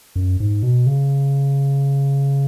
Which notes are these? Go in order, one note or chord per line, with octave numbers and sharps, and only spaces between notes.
F#2
G#2
B2
C#3